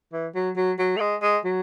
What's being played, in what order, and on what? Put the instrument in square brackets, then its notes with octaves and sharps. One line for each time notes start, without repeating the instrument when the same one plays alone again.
[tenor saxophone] E3
F#3
F#3
F#3
A3
G#3
G#3
F#3